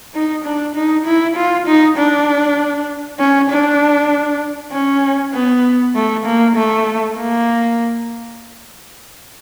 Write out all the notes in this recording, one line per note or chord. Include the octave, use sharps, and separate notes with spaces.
D#4
D4
D#4
E4
F4
D#4
D4
C#4
D4
C#4
B3
A3
A#3
A3
A#3